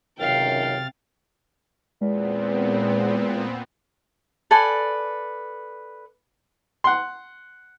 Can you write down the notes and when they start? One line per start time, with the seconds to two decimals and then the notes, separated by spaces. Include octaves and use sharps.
0.20 C#2 F#2 C3 D#3 F5 G5 F6 A6
2.01 E2 A#2 G#3 B3 C4
4.51 A4 B4 D5 G#5
6.84 F#5 C6